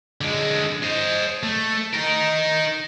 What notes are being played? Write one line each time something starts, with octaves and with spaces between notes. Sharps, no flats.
D3 G#3
C5 D#5
A3
D#4 A#4